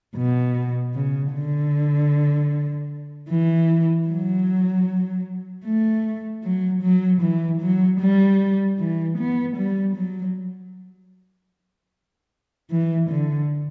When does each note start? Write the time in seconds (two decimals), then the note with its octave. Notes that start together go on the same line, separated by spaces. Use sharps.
0.16 B2
0.95 C#3
1.34 D3
3.30 E3
4.08 F#3
5.65 A3
6.44 F#3
6.83 F#3
7.22 E3
7.61 F#3
8.00 G3
8.79 E3
9.18 B3
9.57 G3
9.96 F#3
12.71 E3
13.10 D3